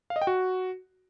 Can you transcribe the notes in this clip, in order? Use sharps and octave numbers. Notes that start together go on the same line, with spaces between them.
F5
D#5
G5
F#4